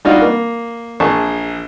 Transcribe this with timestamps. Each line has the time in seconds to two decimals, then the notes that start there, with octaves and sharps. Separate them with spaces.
0.05 G3 D4 D#4 F4 F#4
0.21 A#3
1.00 A#1 G#4 A5 C#6